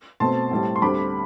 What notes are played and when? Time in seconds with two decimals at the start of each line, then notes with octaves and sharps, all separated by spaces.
0.20 B2 A3 C4 A5 C6
0.51 A2 G3 C4
0.76 C6
0.82 D2 D3 G3 C4 B5 D6